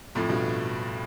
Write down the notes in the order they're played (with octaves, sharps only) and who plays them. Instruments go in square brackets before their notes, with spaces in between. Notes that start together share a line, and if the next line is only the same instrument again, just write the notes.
[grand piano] F2 A2
G2 B2